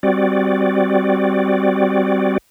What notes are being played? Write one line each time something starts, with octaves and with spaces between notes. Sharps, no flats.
G3 C4 F#4 D5